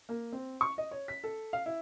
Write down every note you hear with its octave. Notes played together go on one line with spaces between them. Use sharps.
A#3
C4
C#6
D#5
C#5
B6
A4
F5
E4